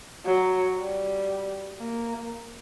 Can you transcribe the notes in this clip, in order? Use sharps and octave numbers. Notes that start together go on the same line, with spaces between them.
F#3
G3
A#3